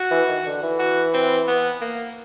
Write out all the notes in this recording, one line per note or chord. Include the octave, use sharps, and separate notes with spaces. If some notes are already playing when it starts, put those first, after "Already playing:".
Already playing: F#4
E3
D#3
D3
E3
F#4
C4
B3
A#3